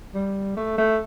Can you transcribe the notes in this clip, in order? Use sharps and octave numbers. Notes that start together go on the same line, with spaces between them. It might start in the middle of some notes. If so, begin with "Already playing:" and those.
G3
A3
A3